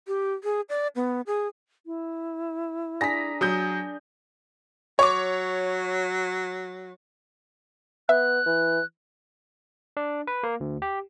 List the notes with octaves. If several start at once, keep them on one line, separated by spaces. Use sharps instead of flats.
G4
G#4
D5
B3
G#4
E4
D4 G#4 A#5 A#6 B6
F#3 D#6 G6
F#3 C#5 C#6 D6
B3 E5 F#6
E3
D4
B4
A#3
D2
G4